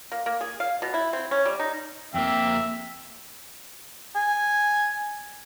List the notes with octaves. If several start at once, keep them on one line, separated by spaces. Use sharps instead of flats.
A#3
A#3
G#4
F5
B2
E4
C4
C#4
G3
D#4
F2 A#3 C4 E5
G#5